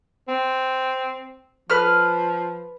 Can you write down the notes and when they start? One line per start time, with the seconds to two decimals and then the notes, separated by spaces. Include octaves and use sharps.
0.28 C4
1.70 F3 B4 F6